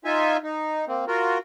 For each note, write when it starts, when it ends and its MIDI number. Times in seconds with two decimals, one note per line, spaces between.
0.05 0.37 63
0.05 0.37 65
0.05 0.37 76
0.05 0.37 80
0.43 0.85 63
0.88 1.05 58
0.88 1.05 60
1.08 1.38 65
1.08 1.38 66
1.08 1.38 70